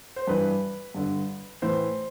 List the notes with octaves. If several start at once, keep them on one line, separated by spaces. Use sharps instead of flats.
C5
G2 E3 B4
G2 D3
A2 E3 C5